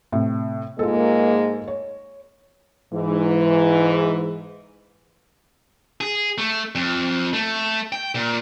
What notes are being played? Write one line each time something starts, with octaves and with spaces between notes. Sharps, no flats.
A2 C3
G#2 G#3 A#3 F4 A4
C#5
G#2 E3
G#4
A3
F2
A3
G5
A#2